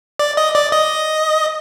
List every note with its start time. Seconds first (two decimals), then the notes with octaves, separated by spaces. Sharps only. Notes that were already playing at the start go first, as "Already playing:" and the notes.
0.19 D5
0.37 D#5
0.55 D5
0.72 D#5